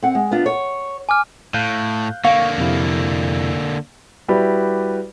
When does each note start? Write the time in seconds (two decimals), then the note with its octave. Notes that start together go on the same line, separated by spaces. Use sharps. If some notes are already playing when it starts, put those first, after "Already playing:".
0.02 C4 F#5
0.15 G#3
0.31 B3 D4 F4
0.46 C#5
1.09 G#5 D6 F6
1.54 A2 F5 F#6 G6
2.24 D3 A#3 F5 C#6
2.58 F2 C3 E4
4.28 G3 E4 F#4 G4 B4 D5